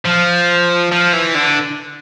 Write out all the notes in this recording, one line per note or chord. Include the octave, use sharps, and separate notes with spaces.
F3
F3
E3
D3